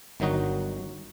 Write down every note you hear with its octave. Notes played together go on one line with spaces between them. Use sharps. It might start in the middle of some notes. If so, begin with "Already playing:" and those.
G1 D#3 F#3 D#4 F#4